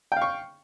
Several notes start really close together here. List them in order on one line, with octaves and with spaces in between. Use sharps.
G5 F5 C#6